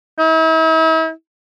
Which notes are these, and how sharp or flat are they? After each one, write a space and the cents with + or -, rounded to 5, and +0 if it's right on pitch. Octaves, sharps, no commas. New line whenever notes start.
E4 -45